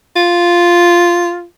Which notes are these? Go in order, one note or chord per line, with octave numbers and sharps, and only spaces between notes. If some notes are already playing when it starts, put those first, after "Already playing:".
F4